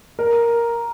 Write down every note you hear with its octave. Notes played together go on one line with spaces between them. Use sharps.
A#4